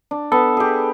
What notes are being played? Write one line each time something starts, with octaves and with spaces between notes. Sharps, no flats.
D4
B3 A4
G4 G#4